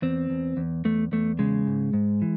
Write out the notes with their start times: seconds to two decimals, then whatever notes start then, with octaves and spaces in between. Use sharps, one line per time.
0.02 E2 C4
0.30 E2
0.57 E2
0.85 E2 A3
1.12 E2 A3
1.39 C#3 G#3
1.67 G#2
1.93 G#2
2.22 E3